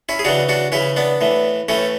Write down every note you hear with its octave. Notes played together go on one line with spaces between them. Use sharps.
C#4 E4
G#4
C#3 E3 D4 F#4
D4 F#4
C#3 E3 C#4 E4
B3 D4
A2 E3
A2 E3 A3 C#4